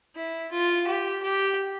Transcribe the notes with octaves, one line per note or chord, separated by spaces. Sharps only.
E4
F4
G4
G4